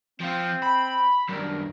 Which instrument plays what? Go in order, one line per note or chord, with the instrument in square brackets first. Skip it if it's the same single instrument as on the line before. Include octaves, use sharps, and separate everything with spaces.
[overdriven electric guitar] F3 F4 [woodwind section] C4
[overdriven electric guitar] B5
[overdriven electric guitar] B1 F#2 [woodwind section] G3 D4 A#4